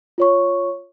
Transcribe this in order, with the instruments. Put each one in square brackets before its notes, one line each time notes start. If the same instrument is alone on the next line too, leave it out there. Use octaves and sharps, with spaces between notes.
[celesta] F4 C#5 C#6